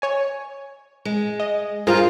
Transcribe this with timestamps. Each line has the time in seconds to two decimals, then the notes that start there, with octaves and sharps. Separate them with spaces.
0.02 C#5 G#5
1.05 G#3
1.40 D#5
1.87 G2 F4 G#4 A#4 C5